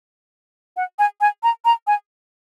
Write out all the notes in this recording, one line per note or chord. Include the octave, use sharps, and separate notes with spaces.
F#5
G#5
G#5
A#5
A#5
G#5